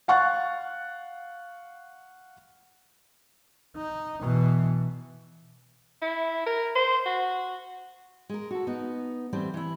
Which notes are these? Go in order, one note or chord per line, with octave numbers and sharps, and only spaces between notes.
F5 F#5 C#6 F#6 A6
D#4
B2 E3
E4
A#4
C5
F#4
G#3 A#4
F#4 A4
B3 D#4
E3 G3 A3 C4
E3 E4